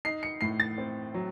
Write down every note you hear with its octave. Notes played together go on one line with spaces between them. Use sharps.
D#4 C7
C#7
A2 C7
A6
C4
F#3